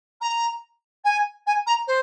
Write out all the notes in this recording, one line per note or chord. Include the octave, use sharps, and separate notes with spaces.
A#5
G#5
G#5
A#5
C5